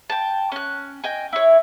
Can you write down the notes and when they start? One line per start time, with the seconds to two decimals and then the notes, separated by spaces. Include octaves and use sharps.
0.10 G5 A5
0.52 C#4 F#6
1.04 D#5 G5 G#5
1.33 E4 C#5